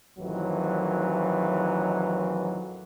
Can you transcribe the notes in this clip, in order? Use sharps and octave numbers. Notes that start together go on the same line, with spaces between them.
A1 F2 D#3 E3 F#3